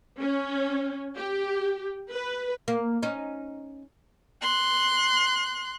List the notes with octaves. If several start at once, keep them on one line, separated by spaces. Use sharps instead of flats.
C#4
G4
B4
A#3
C#4 D#4
C6 F#6